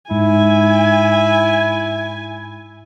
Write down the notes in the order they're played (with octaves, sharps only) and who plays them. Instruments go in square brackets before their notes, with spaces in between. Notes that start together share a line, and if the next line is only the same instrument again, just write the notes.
[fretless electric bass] G#2 [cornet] E4 [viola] G#5